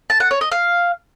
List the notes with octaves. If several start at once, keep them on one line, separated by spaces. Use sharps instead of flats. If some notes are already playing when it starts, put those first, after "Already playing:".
A5
F#5
C#5
D#5
F5